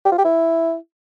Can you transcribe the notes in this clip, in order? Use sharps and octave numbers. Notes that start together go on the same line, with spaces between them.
G4
F4
G4
E4